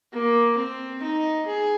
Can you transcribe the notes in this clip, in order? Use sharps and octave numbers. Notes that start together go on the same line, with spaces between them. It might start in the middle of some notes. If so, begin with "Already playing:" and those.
A#3
C4
D#4
G#4